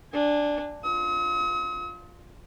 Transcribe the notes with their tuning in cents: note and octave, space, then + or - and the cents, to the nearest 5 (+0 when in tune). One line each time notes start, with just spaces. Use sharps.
D4 +0 G#5 -30
F4 +5 D#6 +45